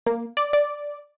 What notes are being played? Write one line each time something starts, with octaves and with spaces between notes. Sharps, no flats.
A#3
D5
D5